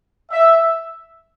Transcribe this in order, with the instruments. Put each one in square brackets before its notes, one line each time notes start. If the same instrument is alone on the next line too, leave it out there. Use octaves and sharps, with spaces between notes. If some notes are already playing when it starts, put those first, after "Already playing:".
[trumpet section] E5